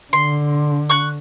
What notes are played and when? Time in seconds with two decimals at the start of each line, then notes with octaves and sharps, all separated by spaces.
0.13 D3 C6
0.90 C#6 F#6